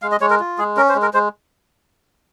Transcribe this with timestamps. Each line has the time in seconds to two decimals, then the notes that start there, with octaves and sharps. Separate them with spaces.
0.02 G#3 F5
0.11 D#5
0.21 G#3 C#5
0.30 A#4
0.40 F4
0.58 G#3 G#4
0.77 C#4 A#4
0.89 C5
0.95 G#3
1.02 A#4
1.14 G#3 C5